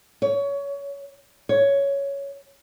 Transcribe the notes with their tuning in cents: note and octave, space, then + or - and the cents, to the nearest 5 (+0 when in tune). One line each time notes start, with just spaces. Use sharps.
C#5 +25
C#5 +5